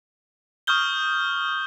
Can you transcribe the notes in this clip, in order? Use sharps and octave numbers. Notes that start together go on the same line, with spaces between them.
C#6 D#6 F6 G6 G7